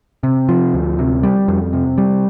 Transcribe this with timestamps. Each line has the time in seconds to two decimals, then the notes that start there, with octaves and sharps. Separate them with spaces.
0.23 C3
0.49 F3
0.74 D2
0.99 C3
1.23 G3
1.48 F2
1.73 C3
1.98 G3